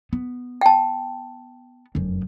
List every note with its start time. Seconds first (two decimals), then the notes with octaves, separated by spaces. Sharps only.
0.13 B3
0.61 G5 A5
1.95 F1 F#2